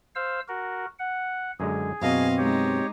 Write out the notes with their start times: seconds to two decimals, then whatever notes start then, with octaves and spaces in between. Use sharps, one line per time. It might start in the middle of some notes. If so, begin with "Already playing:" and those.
0.15 C5 F5 E6
0.48 F#4 A#4
0.99 F#5
1.60 F#2 D3 G#3 G#4
2.02 F#2 B2 C4 D#5 F5
2.38 G#3 D#4 G4 C#5